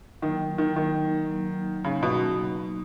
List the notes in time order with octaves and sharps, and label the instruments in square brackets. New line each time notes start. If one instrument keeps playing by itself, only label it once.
[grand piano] D#3 [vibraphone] F#3 A#3 D#4
[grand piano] D#3
[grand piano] D#3 [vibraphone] F#3 A#3 D#4
[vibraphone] F#3 A#3 D#4
[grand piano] C#3 [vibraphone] F#3 A#3 D#4
[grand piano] B2